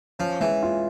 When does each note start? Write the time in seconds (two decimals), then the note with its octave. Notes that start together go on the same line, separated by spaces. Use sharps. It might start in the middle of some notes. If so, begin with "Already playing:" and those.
0.19 F3 C#4
0.40 E3 G#3
0.63 F4